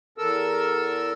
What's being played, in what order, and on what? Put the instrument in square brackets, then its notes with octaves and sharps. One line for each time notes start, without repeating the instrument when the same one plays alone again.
[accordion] E2 A4 A#4 E6